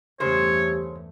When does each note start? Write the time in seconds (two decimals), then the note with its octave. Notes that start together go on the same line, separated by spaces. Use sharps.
0.20 E2 G2 C#3 A3 G4 C5 C#5 E6